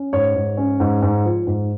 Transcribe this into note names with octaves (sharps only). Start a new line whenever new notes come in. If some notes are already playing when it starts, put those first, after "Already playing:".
Already playing: C#4
G#2 C#5
G#2
C#4
G#2
G#2
F3
G#2